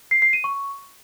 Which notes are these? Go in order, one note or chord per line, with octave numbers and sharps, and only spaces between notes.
C7
C7
D#7
C#6